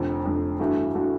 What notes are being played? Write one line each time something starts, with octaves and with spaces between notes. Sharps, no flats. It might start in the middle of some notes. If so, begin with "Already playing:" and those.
Already playing: F1 F2 D3
F1 F2 D3
G2 E3 A3 D4 F#4
E3 A3 D4 F#4